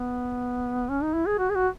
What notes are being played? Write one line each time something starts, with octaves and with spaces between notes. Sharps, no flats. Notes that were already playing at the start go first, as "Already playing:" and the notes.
Already playing: B3
C#4
D#4
E4
G#4
F#4
G#4
F#4